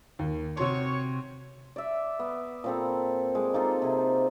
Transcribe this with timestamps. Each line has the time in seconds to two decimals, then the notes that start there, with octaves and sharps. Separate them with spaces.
0.19 D#2
0.57 C3 F#4 C#5 C6
1.76 D5 E5
2.19 B3
2.64 A#2 C4 A4
3.35 G#3 D5
3.54 A#3 D#4 F4 A4
3.82 C3 G#4